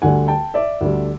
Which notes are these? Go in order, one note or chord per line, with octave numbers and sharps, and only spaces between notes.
D2 D3 G3 F#5 G#5
G5 A5
D5 E5
D2 D3 G3